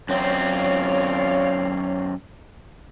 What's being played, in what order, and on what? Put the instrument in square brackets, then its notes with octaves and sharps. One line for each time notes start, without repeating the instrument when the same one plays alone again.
[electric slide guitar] F#2 C4 [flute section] C#5 D5 F5